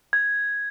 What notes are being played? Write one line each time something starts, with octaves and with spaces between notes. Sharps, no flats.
G#6